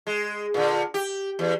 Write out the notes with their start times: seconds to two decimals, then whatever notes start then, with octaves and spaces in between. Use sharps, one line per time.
0.07 G#3
0.54 A#2 D3
0.94 G4
1.39 E2